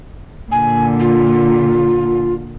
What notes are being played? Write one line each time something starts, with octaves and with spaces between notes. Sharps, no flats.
A#2 D3 G#5
F4